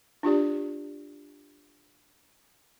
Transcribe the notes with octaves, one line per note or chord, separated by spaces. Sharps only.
D4 F4 G4 D5